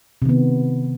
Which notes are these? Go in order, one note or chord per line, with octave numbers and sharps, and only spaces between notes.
C3 D#3 B3